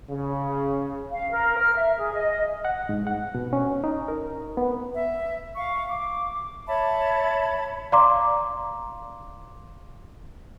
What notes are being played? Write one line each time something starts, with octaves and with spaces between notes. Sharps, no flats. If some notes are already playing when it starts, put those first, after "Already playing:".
C#3
F5
A#4
F6
E5
G#4
D#5
F#5
G#2
F#5
B2
C#4
D#4
A#4
B3
E5
F5 C#6
D6
C#5 E5 A5 B5
D5 F5 A#5 C6 D6